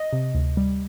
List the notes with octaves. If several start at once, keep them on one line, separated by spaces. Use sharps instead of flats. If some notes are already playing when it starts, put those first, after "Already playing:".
Already playing: D#5
C3
D2
G3